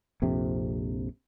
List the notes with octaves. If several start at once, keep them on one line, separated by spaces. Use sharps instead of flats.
A#1 F2 C3